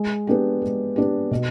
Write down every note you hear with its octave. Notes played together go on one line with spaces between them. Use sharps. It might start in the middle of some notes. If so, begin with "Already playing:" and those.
Already playing: G#3
B3 D4 G4
G#3
B3 D4 G4
B2